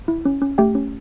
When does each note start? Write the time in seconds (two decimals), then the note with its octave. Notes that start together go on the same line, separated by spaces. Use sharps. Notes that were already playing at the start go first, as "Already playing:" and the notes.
0.08 E4
0.25 C#4
0.42 C#4
0.58 A3 G4 G5
0.75 C#4